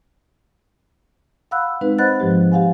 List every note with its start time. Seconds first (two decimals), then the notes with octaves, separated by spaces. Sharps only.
1.51 F5 F#5 B5 E6 F#6
1.81 G#3 C4 D#4 B4
1.98 C5 D#5 F#5 B5 F#6 A6
2.20 G#2 F3 G#3 G4
2.52 G4 F5 F#5 G#5